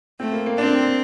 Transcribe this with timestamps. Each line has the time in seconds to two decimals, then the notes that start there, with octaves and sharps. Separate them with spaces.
0.20 A3 C4
0.33 A#3
0.46 A#3
0.58 C4 D4